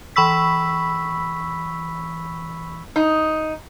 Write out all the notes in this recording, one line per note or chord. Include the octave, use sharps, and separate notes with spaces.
E3 B5 C#6 E6 B6
D#4